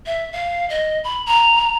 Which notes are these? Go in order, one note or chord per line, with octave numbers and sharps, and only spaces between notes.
E5
F5
D#5
B5
A#5